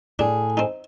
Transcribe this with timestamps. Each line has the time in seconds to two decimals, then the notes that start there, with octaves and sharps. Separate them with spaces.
0.19 A2 D4 G#4
0.57 C4 D#4